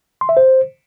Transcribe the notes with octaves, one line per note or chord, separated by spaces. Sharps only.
C6
E5
C5